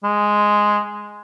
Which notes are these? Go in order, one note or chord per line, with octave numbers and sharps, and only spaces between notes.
G#3